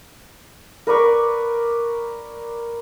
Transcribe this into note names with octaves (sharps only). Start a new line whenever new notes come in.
A#4 B4 D5 C#6